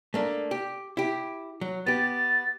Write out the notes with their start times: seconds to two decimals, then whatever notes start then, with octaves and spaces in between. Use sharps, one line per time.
0.14 A3 A#3 D4
0.51 G4
0.97 E4 G4
1.61 F#3
1.86 B3 G4 A6